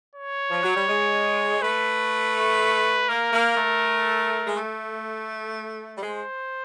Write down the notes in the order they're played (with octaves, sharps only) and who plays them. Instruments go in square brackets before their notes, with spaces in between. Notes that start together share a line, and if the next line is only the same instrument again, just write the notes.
[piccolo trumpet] C#5
[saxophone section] F3
F#3
G3
G#3
[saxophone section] A3 [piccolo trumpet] B4
[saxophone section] A#3 [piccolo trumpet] A#4
[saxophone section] A#3
A3
G#3
A3
G3
[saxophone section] G#3 [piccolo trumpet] C5